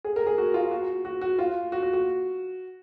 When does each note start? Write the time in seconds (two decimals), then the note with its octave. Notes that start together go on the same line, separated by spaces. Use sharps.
0.04 G#4
0.16 A#4
0.27 G#4
0.38 F#4
0.54 F4
0.71 F#4
1.05 F#4
1.21 F#4
1.39 F4
1.72 F#4
1.82 F#4
1.93 F#4